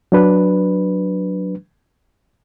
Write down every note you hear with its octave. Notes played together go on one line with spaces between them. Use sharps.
F#3 D4 B4